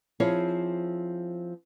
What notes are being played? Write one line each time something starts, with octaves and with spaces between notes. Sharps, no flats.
F3 C4 E4 G#4 C#5